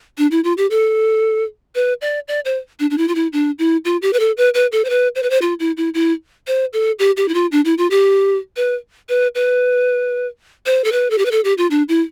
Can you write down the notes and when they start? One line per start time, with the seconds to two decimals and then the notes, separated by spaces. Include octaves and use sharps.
0.18 D4
0.31 E4
0.44 F4
0.57 G4
0.71 A4
1.75 B4
2.01 D5
2.28 D5
2.45 C5
2.80 D4
2.90 D4
2.98 E4
3.08 F4
3.15 E4
3.33 D4
3.59 E4
3.85 F4
4.02 G4
4.13 B4
4.20 A4
4.37 B4
4.54 B4
4.72 A4
4.85 C5
4.90 B4
5.15 C5
5.23 B4
5.30 C5
5.42 F4
5.60 E4
5.77 E4
5.94 E4
6.47 C5
6.73 A4
6.99 G4
7.17 G4
7.28 E4
7.34 F4
7.52 D4
7.65 E4
7.78 F4
7.91 G4
8.56 B4
9.09 B4
9.35 B4
10.66 C5
10.84 A4
10.92 B4
11.10 A4
11.18 G4
11.25 B4
11.31 A4
11.44 G4
11.58 F4
11.71 D4
11.89 E4